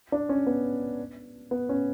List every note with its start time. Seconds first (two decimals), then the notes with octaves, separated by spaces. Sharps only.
0.12 D4
0.29 C#4
0.47 B3
1.51 B3
1.69 C#4